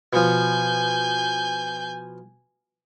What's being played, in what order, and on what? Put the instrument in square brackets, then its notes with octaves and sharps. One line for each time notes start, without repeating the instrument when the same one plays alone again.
[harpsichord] B2 F3 [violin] G#5 G6